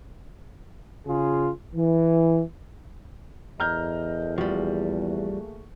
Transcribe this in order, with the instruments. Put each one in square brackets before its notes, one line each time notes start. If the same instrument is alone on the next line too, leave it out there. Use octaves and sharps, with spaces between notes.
[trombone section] C#3 F4 G#4
E3
[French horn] E2 [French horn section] A4 A#4 D#5 [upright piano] A#5 F6 G6
[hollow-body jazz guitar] F3 G3 [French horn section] A3 A#3 G#4 [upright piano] F#4